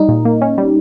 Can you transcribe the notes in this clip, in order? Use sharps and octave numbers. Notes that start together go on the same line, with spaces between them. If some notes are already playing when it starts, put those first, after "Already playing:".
Already playing: G3 D#4
A#2
A#3
C#4
G3